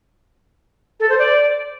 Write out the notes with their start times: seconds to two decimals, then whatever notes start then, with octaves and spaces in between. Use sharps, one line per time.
1.00 A4
1.09 C5
1.19 D5